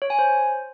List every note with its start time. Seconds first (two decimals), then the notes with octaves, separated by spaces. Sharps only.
0.02 C#5
0.10 G#5
0.19 C5